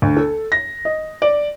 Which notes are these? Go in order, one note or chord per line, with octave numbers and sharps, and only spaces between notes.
D2
A4
A#6
D#5
D5